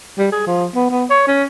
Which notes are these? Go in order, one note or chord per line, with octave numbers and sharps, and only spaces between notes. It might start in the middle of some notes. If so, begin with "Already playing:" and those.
G3
G#4
F3
B3
B3
C#5
C#4